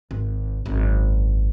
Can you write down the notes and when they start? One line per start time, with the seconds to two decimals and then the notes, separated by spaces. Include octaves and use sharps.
0.11 G#1
0.66 G#1 F#2